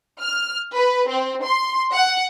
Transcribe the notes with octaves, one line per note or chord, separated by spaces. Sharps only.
F6
B4
C4
C6
F#5